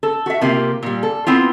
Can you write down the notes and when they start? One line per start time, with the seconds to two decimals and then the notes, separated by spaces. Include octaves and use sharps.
0.03 A4
0.26 F#4 E5
0.41 C3 A#3 F4 G4
0.83 A#2 G3
1.03 A4
1.27 B3 C4 E4 F4